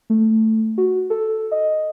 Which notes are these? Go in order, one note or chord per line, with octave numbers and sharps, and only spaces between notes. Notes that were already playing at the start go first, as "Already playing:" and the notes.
A3
F#4
A4
D#5